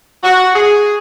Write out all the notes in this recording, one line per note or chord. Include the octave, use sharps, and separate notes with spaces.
F#4
G#4